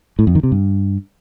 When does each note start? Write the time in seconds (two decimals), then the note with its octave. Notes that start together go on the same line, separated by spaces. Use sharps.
0.19 A2
0.27 F2
0.35 D#3
0.43 C3
0.52 G2